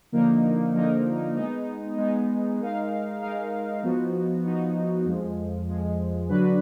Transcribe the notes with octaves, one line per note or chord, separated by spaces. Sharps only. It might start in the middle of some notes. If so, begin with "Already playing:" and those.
D3 F3 A#3 D#4 A#4
D3 F3 A#3 D#4 A#4
G#3 B3 D#4
G#3 B3 D#4
G#3 D#4 A#4 F5
G#3 D#4 A#4 F5
F3 B3 D#4 F#4
F3 B3 D#4 F#4
F2 F3 G#3
F2 F3 G#3
D3 F#3 D4 F#4 B4